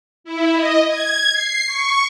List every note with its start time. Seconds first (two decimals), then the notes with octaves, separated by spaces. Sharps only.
0.24 E4
0.55 D#5
0.88 G#6
1.33 C7
1.66 C#6